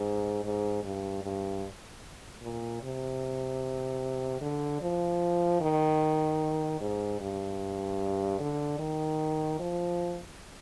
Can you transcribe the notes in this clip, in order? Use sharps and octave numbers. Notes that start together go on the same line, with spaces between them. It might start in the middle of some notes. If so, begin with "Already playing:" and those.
Already playing: G#2
G#2
G2
G2
A#2
C3
D3
F3
D#3
G#2
G2
D3
D#3
F3